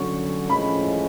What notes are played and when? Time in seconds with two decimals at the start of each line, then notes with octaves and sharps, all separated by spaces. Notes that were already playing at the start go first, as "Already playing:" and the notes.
Already playing: D3 F#3 C#4 C#6
0.50 A2 F3 G#3 C#4 B5